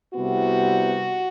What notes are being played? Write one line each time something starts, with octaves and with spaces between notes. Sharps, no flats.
C2 C3 G3 B3 F#4